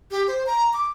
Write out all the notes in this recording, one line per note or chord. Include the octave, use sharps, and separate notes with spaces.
G4
C5
A#5
D6